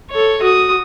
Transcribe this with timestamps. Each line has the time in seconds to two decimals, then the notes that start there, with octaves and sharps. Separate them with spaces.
0.11 A4 C#5
0.42 F#4 D#6